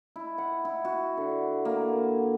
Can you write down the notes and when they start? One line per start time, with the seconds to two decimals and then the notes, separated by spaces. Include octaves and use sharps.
0.16 E4
0.38 F#5
0.65 E4
0.85 F#4
1.17 D3
1.65 A#3